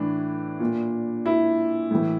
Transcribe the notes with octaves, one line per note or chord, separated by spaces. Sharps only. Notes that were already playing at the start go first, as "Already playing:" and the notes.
Already playing: A2 E3 D4
A#2
E4
A2 E3